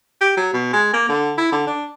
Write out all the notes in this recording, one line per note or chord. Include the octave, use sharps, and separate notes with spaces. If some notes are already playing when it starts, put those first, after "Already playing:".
G4
F#3
B2
G#3
A#3
D3
E4
D3
D4